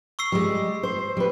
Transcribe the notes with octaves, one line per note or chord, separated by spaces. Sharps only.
C#6 E6 C7
G3 G#3
C5
G3 B4